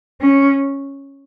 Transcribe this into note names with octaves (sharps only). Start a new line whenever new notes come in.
C#4